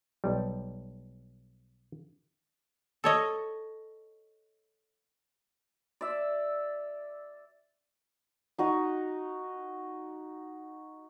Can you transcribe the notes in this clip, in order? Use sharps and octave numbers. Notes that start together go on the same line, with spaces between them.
B1 G3
A4 C#5 D#5
D5 E5
D#4 F#4 D#5